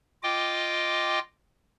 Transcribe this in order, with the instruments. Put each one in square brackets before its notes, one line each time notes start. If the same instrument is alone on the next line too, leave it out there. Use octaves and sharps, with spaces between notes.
[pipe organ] F4 D#5 G5 D6